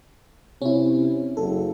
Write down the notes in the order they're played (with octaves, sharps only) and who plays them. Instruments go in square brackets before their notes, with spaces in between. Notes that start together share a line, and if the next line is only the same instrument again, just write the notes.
[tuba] C3 [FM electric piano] C#4 E4
[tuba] F#1 [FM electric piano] A4